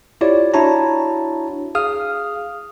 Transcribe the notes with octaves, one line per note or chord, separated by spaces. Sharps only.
E4 F4 G4 C#5 D5
D4 E4 F#4 C#5 A5 A#5
G#4 F5 D#6 F6